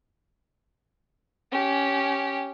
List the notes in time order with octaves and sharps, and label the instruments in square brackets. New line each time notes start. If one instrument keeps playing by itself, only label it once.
[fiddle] C#4 G4